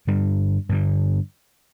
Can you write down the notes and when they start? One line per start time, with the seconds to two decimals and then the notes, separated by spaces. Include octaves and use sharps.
0.07 G2 D3 G3
0.69 G2 D3 G3